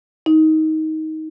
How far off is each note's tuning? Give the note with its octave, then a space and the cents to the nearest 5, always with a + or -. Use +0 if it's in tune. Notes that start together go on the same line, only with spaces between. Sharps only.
D#4 +20